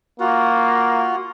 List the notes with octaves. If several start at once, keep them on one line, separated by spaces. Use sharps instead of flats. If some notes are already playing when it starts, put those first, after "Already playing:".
A#3 F4 F#4